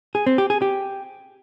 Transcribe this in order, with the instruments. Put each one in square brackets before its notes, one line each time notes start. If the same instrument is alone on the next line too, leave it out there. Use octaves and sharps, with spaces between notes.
[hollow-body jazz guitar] G#4
C4
G4
G#4
G4